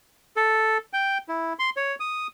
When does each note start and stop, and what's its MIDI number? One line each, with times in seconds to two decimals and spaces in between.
0.37 0.78 69
0.93 1.18 79
1.29 1.53 64
1.59 1.70 84
1.77 1.95 73
2.00 2.27 87